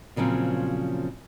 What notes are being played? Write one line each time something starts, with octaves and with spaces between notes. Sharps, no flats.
A#2 C#3 F3 F#3 C4